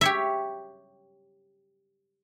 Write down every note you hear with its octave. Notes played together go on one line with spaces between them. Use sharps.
G4 C#5 E5